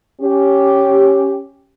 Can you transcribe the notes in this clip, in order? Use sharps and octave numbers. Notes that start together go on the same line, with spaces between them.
C#4 G4